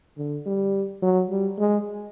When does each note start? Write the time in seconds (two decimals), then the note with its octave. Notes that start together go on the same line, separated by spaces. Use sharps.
0.18 D3
0.46 G3
1.02 F#3
1.30 G3
1.58 G#3